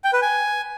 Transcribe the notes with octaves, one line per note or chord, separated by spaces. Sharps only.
G5
B4
G#5